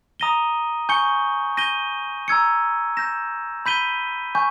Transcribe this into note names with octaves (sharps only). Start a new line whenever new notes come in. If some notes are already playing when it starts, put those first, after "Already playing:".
A#5 D#6 A#6 D#7 G7
G#5 C#6 G6 C#7 G7
G6 A#6 D#7 G7
A#5 E6 G#6 C#7
G6 A#6 E7
B5 G6 B6 D#7 G7
G#5 C#6 G6